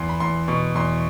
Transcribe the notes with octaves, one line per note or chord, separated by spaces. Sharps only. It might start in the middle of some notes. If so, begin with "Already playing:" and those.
Already playing: E2 C6
B5
E2 C6
B2 C#6
E2 C6